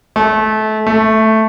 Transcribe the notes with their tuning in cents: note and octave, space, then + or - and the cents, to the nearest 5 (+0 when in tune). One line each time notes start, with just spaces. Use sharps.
A3 -25
A3 +0